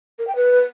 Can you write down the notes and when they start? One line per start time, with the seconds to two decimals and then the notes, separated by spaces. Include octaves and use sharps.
0.19 A#4
0.27 G5
0.36 B4